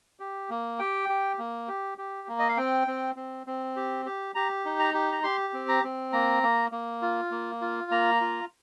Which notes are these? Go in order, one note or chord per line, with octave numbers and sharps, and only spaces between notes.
G4
A#3
G4 G5
G4
A#3
G4
G4
A#3
D#5
F5
C4 G5
C4
C4
C4
G4
G4
G4 A#5
D#4
A#5
G4
A#5
G4 C6
C4
A#5
C4
A#3 A#5
A#3
A#3
F4
A#3
F4
A#3 A#5
F4